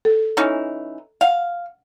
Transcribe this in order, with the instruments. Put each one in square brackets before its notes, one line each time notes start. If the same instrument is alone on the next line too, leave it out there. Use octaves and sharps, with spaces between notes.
[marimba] A4
[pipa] E3 C#4 D#4
[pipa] F5 [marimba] F#5